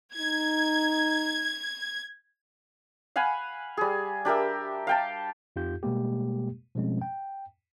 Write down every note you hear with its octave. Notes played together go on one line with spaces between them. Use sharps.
D#4 G#6
F5 F#5 G#5 B5
G3 G#4
D4 G4 A#4 E5
F5 G5 A5
F2 D#4 F4 G4 G6
B2 G3 G#3 A#3 G4
B2 F3 G3 G#3 C4 C#4
G5